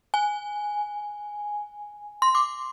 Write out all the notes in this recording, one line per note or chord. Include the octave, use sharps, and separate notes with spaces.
G#5
C6
D6